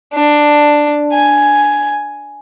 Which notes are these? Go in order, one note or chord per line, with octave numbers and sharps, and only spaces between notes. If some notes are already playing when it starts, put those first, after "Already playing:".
D4
G#5